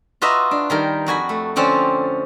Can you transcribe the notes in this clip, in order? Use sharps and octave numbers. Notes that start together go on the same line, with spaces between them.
F4 F#4 B4 D#5 E5 A#5
D4
D#3 G3 A#4
F2 F#4 G#5 B5
A3
D3 F3 C4 C#4 D5